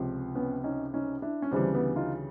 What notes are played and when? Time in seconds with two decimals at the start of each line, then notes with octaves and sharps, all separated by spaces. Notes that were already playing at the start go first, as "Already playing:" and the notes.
Already playing: C#2 C3 F3
0.35 B3 C#4
0.64 C#4 D#4
0.94 C#4 D#4
1.22 D4 E4
1.42 C#4
1.51 D2 C#3 E3 G3 C4 D4
1.74 B3
1.96 D#4 F4